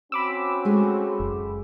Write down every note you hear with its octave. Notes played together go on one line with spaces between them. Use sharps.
C4 C#4 F#4 B5 D6 E6
G#3 A3 G#4
F#1